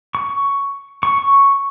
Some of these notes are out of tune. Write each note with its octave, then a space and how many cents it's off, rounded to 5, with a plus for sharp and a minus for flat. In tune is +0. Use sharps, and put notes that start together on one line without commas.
C#6 +10
C#6 +0